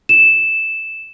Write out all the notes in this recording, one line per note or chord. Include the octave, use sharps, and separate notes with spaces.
E7